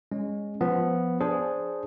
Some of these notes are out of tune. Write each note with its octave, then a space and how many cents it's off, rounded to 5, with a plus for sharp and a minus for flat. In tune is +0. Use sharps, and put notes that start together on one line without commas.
G#3 -20 C#4 +0
F3 +0 B3 +0
D4 -10 G#4 +0 C5 +0